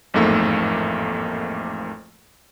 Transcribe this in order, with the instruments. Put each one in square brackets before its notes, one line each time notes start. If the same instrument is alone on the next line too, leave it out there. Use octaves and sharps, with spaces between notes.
[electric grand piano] A1 F2 G#2 A3 A#3 E6